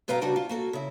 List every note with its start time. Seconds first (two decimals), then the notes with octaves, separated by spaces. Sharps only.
0.08 G2 B2 B4 F5 G5 A#5
0.21 C#3 G3 D4 F#4 A#4 C5
0.36 F4
0.49 A#3 F#4 A4
0.73 C#3 E4